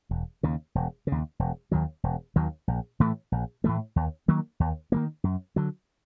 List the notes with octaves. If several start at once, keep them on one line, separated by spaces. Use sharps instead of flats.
E1
D#2 C#3
E1
D#2 C#3
E1
D#2 D#3 F#3
E1
D#2 D#3 F#3
A#1
A2 E3 A3
A#1
A2 E3 A3
D#2
D#3 F#3 A#3
D#2
D#3 F#3 A#3
F#2
D3 F#3